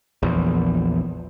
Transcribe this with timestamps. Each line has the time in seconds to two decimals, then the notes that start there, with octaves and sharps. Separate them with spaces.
0.23 A#1 E2